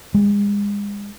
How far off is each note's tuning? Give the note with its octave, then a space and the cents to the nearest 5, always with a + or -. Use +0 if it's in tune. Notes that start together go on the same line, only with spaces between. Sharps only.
G#3 -35